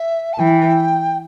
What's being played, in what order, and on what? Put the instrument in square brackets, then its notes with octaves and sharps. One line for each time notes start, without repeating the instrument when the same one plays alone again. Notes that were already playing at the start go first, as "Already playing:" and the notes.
Already playing: [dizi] E5
A5
[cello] E3 [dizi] G5